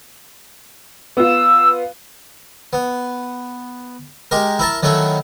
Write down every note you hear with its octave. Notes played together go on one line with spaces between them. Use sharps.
B3 F4 E6
B3
G#3 G4 A#4
E4 A#4 A5
D#3 F#3 A3 C#4 E4